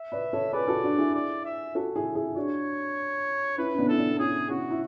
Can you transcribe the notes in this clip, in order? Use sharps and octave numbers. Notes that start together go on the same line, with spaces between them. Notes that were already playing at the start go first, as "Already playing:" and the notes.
Already playing: E5
B4 D5
A4 C#5
G#4 B4 D5
F#4 A4
D4 F#4
E4 G#4
D5
E5
F#4 A4
E4 G#4
E4 G#4
D4 F#4 C#5
C#4 E4 B4
C#4
B3 D4
E4 A4
B3 D4
C#4 E4 G#4
C#4 E4 F#4
E4